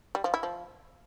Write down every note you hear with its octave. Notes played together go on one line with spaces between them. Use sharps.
G3
F3
E4
F3